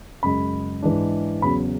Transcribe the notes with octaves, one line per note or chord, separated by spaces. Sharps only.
F#2 C#3 G#3 B5
G#2 E3 G#3 D4
E2 C#3 F#3 B5